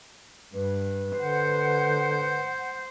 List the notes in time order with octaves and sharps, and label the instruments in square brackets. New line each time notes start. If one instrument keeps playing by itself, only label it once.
[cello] G2 [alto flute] B4
[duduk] D3 [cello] C5 [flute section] F#5 G6